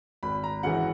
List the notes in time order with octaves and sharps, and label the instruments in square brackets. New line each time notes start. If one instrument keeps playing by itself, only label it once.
[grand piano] G#1 B5
A#5
F#2 C#3 E3 F#5